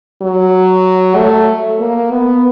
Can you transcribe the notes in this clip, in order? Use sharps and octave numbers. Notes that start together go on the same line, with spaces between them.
F#3
A3
A#3
B3